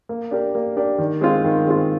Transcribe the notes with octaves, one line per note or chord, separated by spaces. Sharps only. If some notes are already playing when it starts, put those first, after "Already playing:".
A#3
D4 G4 A#4
A#3
D4 G4 A#4
D#3
G#3 C4 F4
D#3
G#3 C4 F4